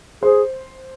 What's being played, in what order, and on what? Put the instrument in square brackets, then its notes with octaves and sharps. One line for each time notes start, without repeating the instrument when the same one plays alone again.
[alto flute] G#4 [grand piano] C5